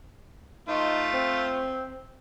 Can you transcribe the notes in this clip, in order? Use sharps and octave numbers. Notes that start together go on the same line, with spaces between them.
A3 D#4 F4 C5
C4